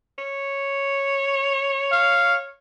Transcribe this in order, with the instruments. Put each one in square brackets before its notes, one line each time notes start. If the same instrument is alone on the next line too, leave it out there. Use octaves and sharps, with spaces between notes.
[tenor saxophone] C#5
[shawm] F5